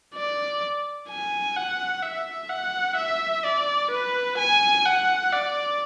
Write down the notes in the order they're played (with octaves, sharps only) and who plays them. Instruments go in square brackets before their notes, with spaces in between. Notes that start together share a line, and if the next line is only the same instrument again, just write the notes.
[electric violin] D5
G#5
F#5
E5
F#5
E5
D5
B4
G#5
F#5
D5